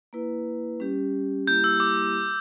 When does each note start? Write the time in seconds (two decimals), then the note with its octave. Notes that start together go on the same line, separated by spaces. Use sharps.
0.13 A#3 E4 B4
0.80 G3 C#4 G4
1.47 G3 A#3 E4 G4 G6
1.64 E6
1.80 D6